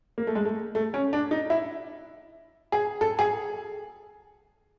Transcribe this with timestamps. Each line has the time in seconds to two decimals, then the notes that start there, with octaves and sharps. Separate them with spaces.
0.18 A#3
0.27 A3
0.35 G#3
0.45 A3
0.75 A3
0.94 C#4
1.13 D4
1.31 D#4
1.50 E4
2.72 G#4
3.01 A4
3.19 G#4